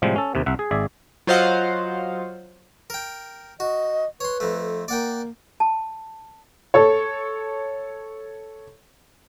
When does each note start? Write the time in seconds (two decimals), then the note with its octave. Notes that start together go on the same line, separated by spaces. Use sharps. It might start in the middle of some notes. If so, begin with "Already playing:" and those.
0.02 A2 C3 F3 G3 G#3
0.16 C#4 A4
0.35 D#2 C3
0.46 C2 E5 F#5
0.59 G#4
0.71 G#1 G#4 D5 E5
1.27 F#3 F4 C5 D#5 F5 F#5
2.90 A#4 G5
3.60 F#4 D#5
4.21 B4 C#5 C6
4.40 F2 A3
4.88 A#3 D5 F#5 G5
5.60 A5
6.74 A4 C#5